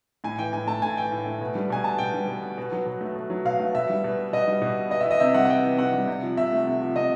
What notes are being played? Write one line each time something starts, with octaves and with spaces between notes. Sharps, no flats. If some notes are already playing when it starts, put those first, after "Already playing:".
A2 G#5
E3 G5
A2 G#5
A3 A5
A2 G#5
E3 G5
A2
A3
B2
G3
B2 G#5
B3 A5
B2 G5
G3
B2
B3
B2
F#3
B2
A3
B2
F#3
B2 F5
A3
B2 E5
G3
B2
B3
B2 D#5
G3
B2
B3
B3 D#5
E5
E3
D#5
C3 E5
G3 F#5
F#5
B3 G5
E3
C3 F#5
G3
C3
F3
C3 E5
A3
C3
F3
C3 D#5